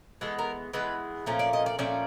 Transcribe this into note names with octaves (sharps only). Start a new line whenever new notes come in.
E3 G#3 B3 A4
A#4
E3 G#3 B3 B4
A#2 F3 A3 C#4
D5
D#5
D5
A#2 F3 A3 C#4 D5